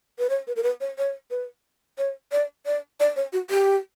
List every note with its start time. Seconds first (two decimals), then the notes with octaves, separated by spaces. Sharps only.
0.19 B4
0.30 C#5
0.47 B4
0.56 A#4
0.63 B4
0.81 C#5
0.98 C#5
1.31 B4
1.98 C#5
2.32 D5
2.66 D5
3.00 D5
3.16 C#5
3.33 F#4
3.50 G4